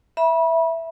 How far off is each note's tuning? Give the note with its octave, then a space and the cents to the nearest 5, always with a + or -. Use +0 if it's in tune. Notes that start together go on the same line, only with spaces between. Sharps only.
E5 +0 B5 -30